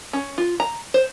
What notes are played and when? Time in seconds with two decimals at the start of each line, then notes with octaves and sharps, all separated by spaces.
0.13 C#4
0.38 F4
0.60 A#5
0.94 C5